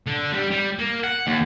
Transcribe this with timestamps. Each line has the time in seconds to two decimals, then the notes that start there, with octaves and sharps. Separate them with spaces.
0.07 D3
0.32 G3
0.51 G3
0.79 A#3
1.04 F#5
1.27 D#2